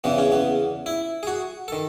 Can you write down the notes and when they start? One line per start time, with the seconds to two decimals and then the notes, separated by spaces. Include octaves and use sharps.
0.04 E2 C#3 E3 B3
0.18 C#4
0.32 B3
0.86 E4
1.23 G#4
1.27 F#4
1.68 D#3 A4